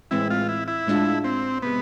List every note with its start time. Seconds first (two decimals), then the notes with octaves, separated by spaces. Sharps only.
0.11 A2 E3 G#3 C4 E4
0.30 F4
0.49 E4
0.68 E4
0.87 A2 G#3 D4 F4
1.24 C4
1.62 C3 G#3 B3